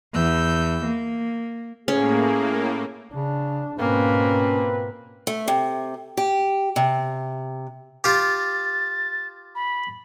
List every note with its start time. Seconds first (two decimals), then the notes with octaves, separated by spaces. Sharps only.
0.13 E2 E6 G6
0.86 A#3
1.88 A2 A#3 C#4 G#4
3.14 C#3 D4
3.80 G#2 B2 A#3 C4 C#4 F4 B4
5.27 A3
5.48 C3
6.17 G4
6.76 C3
8.04 F4 G4 A6
9.55 B5